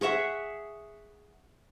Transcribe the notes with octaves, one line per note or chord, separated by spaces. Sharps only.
G#4 C#5 E5 F#5